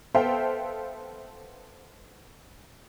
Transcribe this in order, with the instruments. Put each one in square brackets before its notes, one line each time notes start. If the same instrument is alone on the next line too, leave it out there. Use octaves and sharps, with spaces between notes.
[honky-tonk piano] B3 A4 C5 E5 F5 G5